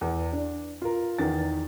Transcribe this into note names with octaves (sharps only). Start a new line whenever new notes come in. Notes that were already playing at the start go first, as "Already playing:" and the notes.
E2
D4
F4 A#4
E2 D#3 A6